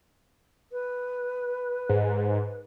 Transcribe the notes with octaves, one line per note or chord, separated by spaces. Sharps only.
B4
G#2